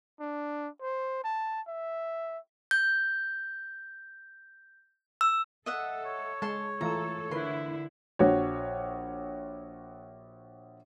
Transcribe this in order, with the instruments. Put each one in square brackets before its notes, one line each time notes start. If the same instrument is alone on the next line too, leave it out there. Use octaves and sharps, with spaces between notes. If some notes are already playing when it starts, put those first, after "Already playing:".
[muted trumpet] D4
C5
A5
E5
[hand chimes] G6
E6
[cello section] A4 [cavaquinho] D#5 E5 F#5
[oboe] C#5
[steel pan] G#3 [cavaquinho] A5 C6
[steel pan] E3 A3 F4 [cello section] A4 [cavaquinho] A#5
[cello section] D3 E4 [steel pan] A#4 B4 [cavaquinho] C6
[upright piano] A#1 F#4 C#5